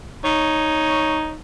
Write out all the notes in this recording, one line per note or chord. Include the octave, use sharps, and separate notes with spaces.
D#4 C#5